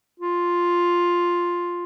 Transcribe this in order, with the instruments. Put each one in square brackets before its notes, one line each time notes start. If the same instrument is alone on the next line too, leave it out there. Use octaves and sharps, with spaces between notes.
[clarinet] F4